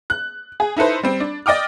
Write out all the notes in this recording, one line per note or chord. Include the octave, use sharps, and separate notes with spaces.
F#6
G#4
D#4 E4 A4 B4 C5
G3 C4
D4
D5 D#5 G5 D6 F6